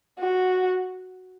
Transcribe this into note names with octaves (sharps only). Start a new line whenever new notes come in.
F#4